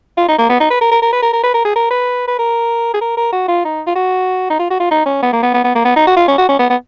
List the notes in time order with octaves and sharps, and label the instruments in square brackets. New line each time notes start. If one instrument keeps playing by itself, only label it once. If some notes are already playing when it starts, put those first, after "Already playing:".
[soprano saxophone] F4
D#4
A#3
B3
D#4
B4
A#4
A#4
A#4
B4
A#4
A#4
B4
A#4
G#4
A#4
B4
B4
A#4
G#4
A#4
A#4
F#4
F4
D#4
F4
F#4
D#4
F4
F#4
F4
D#4
C#4
B3
A#3
B3
B3
B3
A#3
B3
D#4
F#4
F4
C#4
F#4
C#4
B3
B3